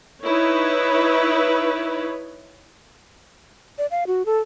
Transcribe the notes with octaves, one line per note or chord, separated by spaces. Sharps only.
D#4 E4 B4 C#5
D5
F5
F#4
A4